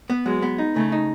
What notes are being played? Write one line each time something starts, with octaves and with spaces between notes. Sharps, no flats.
B3
F#3 G#3
B3
D#4
C#3 A3
D#4